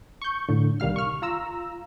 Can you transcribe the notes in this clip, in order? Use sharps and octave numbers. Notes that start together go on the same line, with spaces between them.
C#6 G6
A2 D3
C2 D#3 G3 F5 F6
C#6 F6
F4 A#5 E6